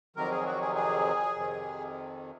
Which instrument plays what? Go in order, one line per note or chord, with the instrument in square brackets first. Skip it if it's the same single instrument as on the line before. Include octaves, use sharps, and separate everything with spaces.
[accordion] F2 C3 D#3 F#3 A#4
G#4
F#4
G#4
G#4
F2 C3 D#3